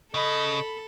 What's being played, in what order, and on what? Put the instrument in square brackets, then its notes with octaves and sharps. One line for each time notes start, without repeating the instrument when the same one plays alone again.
[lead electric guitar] C#3 [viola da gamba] A4 [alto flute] D#5 [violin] B5